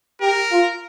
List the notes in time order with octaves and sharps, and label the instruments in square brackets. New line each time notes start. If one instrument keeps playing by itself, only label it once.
[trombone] G4 [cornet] A#4
[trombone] F4